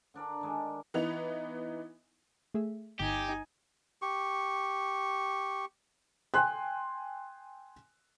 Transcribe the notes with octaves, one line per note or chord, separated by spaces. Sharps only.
D3 D4 A#4 D5
D#3 G#3 D4
E3 B3 D#4 F7
A3 G#4 E5
G1 D#4 G4 G#5 D6
G4 C#6
G5 G#5 C6 F#6